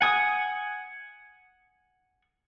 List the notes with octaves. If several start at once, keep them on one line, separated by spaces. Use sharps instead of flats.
F#5 G#5 D#6